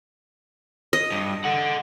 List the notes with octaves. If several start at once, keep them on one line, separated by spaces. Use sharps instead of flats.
D#5
G2
A4 F#5